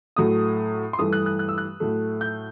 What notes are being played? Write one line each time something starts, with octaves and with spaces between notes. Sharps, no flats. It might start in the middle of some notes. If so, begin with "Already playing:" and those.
A2 F#3 A3 D#6
C6
G2 E3 A3 D#6
F#6
F#6
F#6
E6
F#6
A2 F#3 A3
G6